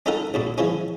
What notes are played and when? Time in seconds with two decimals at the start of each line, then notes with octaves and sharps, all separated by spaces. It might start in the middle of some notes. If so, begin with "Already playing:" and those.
0.06 C#4 D#4 F4 A4 A#4 F#5
0.34 A#1 F#2 A#2
0.58 E3 F3 G#3 C#4